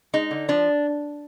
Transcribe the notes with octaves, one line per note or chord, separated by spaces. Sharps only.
G#3 D#4
D3
F3 D4